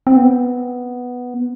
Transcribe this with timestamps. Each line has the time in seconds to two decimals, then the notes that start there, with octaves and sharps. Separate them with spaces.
0.07 C4
0.17 B3